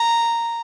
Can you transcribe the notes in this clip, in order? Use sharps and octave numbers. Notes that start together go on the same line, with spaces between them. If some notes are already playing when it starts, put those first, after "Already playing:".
Already playing: A#5